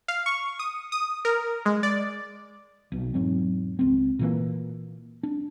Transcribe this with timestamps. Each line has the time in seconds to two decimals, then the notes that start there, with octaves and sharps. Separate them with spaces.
0.08 F5
0.26 C#6
0.59 D#6
0.92 D#6
1.25 A#4
1.66 G#3
1.83 D5
2.92 B1 B2
3.14 E1 G#2 F#3 C4
3.79 C#2 C4
4.19 A#2 E3 A#3
5.23 D4